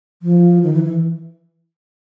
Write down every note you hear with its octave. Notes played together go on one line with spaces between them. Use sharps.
F3
D#3
E3
E3